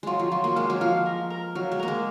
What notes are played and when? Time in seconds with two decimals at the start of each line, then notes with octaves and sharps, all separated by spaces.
0.03 F#3 G#3 F4
0.19 F3
0.32 F#3 F4
0.44 A#3
0.56 G#3 F5
0.70 F#3
0.81 F3 F5
1.06 A#4
1.30 A#4
1.55 F#3 F5
1.72 G#3
1.79 A#3 A#4
1.88 G#3